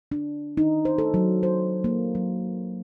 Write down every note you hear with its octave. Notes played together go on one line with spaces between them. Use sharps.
D4
D#4
C5
A4
F#3
C5
A#3
F#3